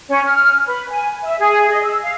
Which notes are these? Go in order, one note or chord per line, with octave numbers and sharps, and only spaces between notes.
C#4
F6
B4
G#5
E5
G#4
D#5
E6
F5